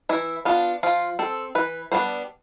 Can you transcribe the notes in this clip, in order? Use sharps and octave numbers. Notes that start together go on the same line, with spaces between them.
E3 E4
B3 D4 F4
F3 F4
C4 A4
E3 B4
G3 B3 D4 C5